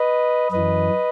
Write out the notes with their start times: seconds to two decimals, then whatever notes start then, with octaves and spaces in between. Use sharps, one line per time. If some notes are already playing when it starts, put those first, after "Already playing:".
Already playing: B4 D#5
0.52 F#2 E3 B4 D#5